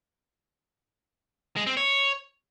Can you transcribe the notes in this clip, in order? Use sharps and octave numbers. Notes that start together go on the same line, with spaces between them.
G#3
C4
C#5